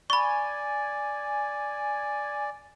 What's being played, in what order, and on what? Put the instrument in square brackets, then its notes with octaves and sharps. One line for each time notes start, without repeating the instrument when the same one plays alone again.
[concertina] D5 [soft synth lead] G#5 [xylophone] B5 C#6